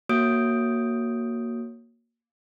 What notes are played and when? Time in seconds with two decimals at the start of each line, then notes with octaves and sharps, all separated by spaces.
0.09 A#3 F#4 C#5 D#6 G6 D7